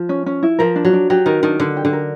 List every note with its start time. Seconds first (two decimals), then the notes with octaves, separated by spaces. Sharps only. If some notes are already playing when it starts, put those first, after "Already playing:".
Already playing: F3
0.09 C#4
0.26 C#4
0.43 E4
0.59 F3 A#4
0.76 D4
0.85 F#3
0.93 D4
1.10 F#3 G4
1.26 D#3 A#4
1.43 D#3 D4
1.60 D3 D4
1.77 G4
1.85 D3
1.93 A#4